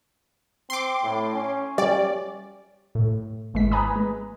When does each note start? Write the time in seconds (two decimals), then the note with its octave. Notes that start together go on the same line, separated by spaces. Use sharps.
0.70 C4 C6 D6
1.04 A2
1.34 C#4
1.78 G3 D5
2.95 A2
3.54 G#1 E3 G#3 B6
3.72 B4 G#5 A#5 B5 D#6
3.96 G#3